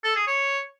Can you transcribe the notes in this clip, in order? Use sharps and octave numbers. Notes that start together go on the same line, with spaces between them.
A4
G#4
C#5